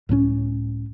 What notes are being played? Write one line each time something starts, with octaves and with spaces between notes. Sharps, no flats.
C#2 A2 G#3 C#4